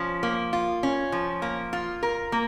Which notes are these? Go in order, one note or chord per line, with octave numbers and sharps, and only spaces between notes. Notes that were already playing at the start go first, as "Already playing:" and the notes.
Already playing: F3 C#4
A#3
F4
C#4
F3
A#3
F4
A#4
A#3